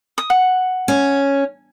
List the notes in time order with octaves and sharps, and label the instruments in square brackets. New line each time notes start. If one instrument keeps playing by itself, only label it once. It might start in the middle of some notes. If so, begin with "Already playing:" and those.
[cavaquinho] D#6
F#5
[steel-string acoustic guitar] C#4